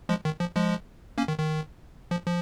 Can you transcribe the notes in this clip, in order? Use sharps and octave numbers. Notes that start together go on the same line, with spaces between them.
F3 G#3
D#3
F3
F3 G#3
A#3 C#4
D#3
D#3
F3
F3